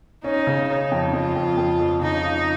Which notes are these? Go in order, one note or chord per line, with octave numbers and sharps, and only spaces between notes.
C#4 D#4
C#3
C#4 D#4
F2
F2 F4
F2
F2
F2
C#3 D#4
F4